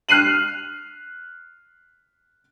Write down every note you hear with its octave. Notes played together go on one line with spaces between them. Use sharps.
F6 F#6 C7 D#7 F#7